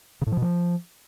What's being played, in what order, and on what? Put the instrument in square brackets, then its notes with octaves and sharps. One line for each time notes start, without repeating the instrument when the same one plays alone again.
[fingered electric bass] C#3
A2
F3
B2
F3